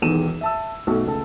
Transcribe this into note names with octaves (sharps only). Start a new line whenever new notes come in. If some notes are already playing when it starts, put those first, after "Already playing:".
E1 B1 E2 D#3 D#7 E7
E5 A5 E6
B1 A3 F#4
C#2 A3 A4 A5